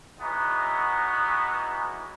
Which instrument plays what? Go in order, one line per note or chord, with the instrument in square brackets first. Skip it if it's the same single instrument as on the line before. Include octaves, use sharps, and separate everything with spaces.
[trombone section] E3 F#3 G#3 B3 D#4